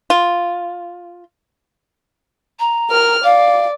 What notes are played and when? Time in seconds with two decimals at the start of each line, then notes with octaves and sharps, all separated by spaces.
0.10 F4
2.59 A#5
2.90 A#4 F6
3.24 D5 F5